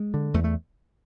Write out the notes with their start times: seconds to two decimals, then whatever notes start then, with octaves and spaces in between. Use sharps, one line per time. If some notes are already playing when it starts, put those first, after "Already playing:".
Already playing: G#3
0.14 D3
0.34 E2 A3
0.44 A3